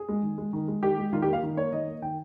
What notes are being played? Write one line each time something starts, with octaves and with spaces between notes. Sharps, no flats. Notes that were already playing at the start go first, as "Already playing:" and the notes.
Already playing: G#4
G#3
D#3
G#3
D#3
G#3
D#3 G4
G#3
D#3 F4
G4
A#3 F5
D#3
A#3 C#5
D#3 D#5
A#3
D#3 G5